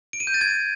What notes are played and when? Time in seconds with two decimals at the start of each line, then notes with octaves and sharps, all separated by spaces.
0.13 D7
0.20 D#7
0.27 G6
0.34 A6
0.41 G#6